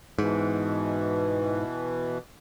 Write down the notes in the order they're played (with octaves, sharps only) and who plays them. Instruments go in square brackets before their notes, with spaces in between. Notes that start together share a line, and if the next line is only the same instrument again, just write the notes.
[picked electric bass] G#2 [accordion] B2 E3